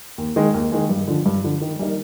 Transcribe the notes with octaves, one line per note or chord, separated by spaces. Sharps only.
D#2
D#3 G#3
D#2
D#3 G#3
G2
D3 F3
G2
D3 F3
D#3
G3 A#3 D#4 A#4